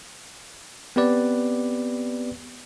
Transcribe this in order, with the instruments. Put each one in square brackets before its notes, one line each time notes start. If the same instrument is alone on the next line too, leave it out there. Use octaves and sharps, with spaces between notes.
[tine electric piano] B3 C4 G4 B4 D5